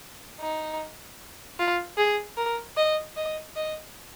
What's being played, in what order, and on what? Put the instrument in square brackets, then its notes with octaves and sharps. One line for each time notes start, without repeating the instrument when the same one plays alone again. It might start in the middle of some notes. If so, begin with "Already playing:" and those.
[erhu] D#4
F4
G#4
A#4
D#5
D#5
D#5